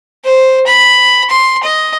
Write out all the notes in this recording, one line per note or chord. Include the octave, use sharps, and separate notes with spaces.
C5
B5
C6
D#5